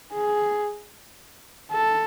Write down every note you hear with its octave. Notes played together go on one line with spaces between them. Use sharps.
G#4
A4